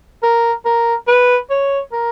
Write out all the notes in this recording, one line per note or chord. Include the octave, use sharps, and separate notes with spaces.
A#4
A#4
B4
C#5
A#4